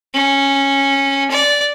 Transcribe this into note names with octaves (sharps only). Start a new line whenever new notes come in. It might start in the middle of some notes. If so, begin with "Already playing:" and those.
C#4
D5